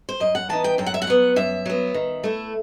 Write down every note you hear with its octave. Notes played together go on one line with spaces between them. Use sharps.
C5
F#2 D#5
F#5
E3 B3 D#4 A5
G5
F#2 G5
F#5
E5
F#5
F#3 B3
F#2 E5
F#3 B3
D#3
A3 E4